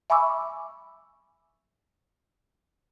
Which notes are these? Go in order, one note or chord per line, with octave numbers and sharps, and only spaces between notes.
E5 G#5 B5 C#6 D6 E6